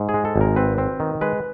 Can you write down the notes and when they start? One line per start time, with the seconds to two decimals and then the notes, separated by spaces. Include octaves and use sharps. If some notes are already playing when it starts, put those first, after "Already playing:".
Already playing: G#2
0.09 G#4
0.14 G#3
0.25 A4
0.36 G#1
0.41 A#4
0.56 C4 B4
0.78 C4
1.00 D#3
1.21 G#3 B4